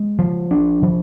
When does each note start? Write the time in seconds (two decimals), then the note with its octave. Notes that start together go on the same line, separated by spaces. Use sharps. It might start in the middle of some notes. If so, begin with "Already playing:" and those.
Already playing: G#3
0.19 F3
0.51 D4
0.82 F3